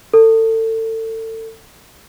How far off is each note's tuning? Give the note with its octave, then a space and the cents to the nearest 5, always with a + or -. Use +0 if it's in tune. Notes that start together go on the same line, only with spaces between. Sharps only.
A4 +30